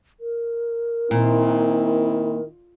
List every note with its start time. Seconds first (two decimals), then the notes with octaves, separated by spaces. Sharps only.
0.20 A#4
1.11 A#2 D#3 C4 E4